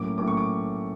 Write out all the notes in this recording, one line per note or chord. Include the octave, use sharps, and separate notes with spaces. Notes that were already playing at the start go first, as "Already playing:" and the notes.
Already playing: A2 F#3 A#3 C#4 D6
A2 F#3 A#3 C#4 D6
C#6
D6